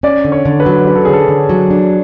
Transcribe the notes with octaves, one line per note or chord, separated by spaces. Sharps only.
C#4 D5
D3
C#5
D3
B4
F#3
C#4 B4
A4
D3 G#4
A4
D3
F#3
D4